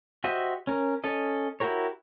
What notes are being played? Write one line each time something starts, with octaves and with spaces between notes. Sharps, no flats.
F#4 G4 C5 D#5 E5
C#4 A#4
C#4 A4 D#5
E4 F#4 G4 A#4 C#5